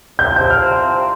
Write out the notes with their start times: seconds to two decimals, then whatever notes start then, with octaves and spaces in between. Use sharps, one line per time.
0.19 C2 C3 F3 C4 G6
0.36 G6
0.50 F6